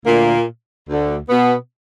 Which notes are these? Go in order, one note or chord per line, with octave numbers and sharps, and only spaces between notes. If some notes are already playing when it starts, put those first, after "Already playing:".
D2 A#2 D3 A#3
D2 D3
B2 B3